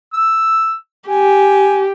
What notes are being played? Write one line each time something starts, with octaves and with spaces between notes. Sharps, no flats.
E6
G4 G#5